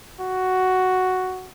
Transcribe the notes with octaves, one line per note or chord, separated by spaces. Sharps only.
F#4